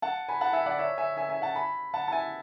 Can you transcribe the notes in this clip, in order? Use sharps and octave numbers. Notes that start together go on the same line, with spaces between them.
F#5 A5
G#5 B5
F#5 A5
E5 G#5
D5 F#5
C#5 E5
E5 G#5
E5 G#5
E5 G#5
F#5 A5
G#5 B5
F#5 A5
A5
E5 G#5